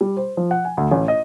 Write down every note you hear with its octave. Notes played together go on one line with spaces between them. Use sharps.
G3
C5
F3
F#5
G#5
D2
A1
D#5